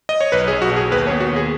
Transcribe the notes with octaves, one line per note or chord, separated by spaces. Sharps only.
D#5
C#5
B1 B4
G#4
B1
F#4
B2
G#4
D#2 B4
C#5
B3
F#4
D#2 G#4